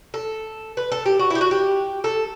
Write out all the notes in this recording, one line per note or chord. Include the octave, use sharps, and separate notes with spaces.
A4
B4
A4
G4
F#4
E4
G4
F#4
G4
A4